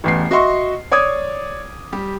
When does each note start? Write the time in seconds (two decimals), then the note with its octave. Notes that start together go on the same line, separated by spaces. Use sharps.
0.04 A1 E2 C7
0.31 F#4 D#5 E5 C6 C#6
0.92 C#5 D5 D6 D#6 G#6
1.93 G3 G4